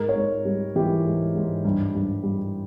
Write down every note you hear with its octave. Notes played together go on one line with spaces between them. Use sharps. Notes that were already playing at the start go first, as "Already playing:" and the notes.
Already playing: G#2 A#4
C#5
G#2
G3
E3 G4
G#2
G#2
G2
G2
G3